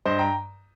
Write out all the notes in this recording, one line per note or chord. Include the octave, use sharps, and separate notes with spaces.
G2 C5 D#5
G5 A#5